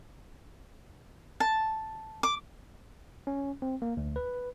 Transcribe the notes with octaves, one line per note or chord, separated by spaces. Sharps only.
A5
D6
C#4
C4
A#3
D2
B4